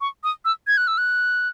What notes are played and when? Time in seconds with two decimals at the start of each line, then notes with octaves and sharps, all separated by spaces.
0.01 C#6
0.24 D#6
0.45 E6
0.67 G#6
0.77 F#6
0.88 E6
0.98 F#6